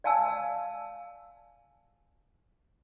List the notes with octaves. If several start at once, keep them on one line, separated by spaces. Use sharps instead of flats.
D5 F5 G#5 A5 E6